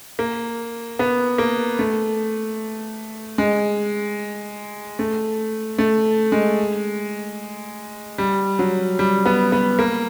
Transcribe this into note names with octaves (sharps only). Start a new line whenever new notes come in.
A#3
B3
A#3
A3
G#3
A3
A3
G#3
G3
F#3
G3
B3
B3
A#3